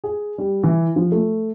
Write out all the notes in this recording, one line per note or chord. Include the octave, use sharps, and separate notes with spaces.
G#4
G3
E3
F3
A3